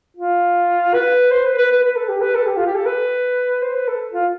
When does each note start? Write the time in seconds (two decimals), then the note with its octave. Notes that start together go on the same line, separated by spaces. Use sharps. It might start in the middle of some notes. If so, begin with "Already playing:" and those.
0.17 F4
0.94 B4
1.31 C5
1.45 B4
1.57 B4
1.71 B4
1.83 B4
1.96 A4
2.09 G4
2.21 B4
2.34 A4
2.47 G4
2.56 F4
2.66 G4
2.75 A4
2.86 B4
3.62 C5
3.75 B4
3.88 A4
4.13 F4